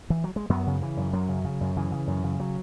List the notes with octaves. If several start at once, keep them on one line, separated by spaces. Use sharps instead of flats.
E3
F#3
G#3
F#2 F#3 B3
C#3
C#3 E3
F#2
F#2 F#3
C#3
C#3
F#2
C#3 E3
C#3
F#2
C#3
F#3